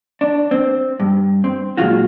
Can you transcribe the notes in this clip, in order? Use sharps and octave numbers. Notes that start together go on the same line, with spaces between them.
D4
C4
G2
C4
A#2 D3 F#3 G#3 F4 F#4